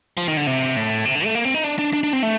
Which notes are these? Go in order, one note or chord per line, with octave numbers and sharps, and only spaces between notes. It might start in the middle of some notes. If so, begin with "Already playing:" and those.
F3
D#3
D3
C3
A2
C3
D3
A3
A#3
C4
D#4
D4
D4
D4
D4
C4
A3